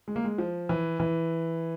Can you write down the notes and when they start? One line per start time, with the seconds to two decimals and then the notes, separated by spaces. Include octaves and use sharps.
0.08 G#3
0.16 A#3
0.24 G#3
0.38 F3
0.69 E3
1.00 E3